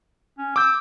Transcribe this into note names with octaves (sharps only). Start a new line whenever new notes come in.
C#4
D6 E6 G6